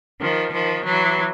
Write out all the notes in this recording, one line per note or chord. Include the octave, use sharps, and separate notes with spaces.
D#3 F3
D#3 F3
E3 F#3